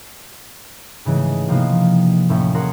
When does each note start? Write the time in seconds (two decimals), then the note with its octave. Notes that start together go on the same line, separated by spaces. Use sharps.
1.05 G#2 C#3 E3 G#3 A3
1.48 C3 F3 A#3 B3 D#4 F4
2.29 D#2 A2 A#3 C#4 E5
2.55 G#4 A#4 F#5 A#5 C6 F#6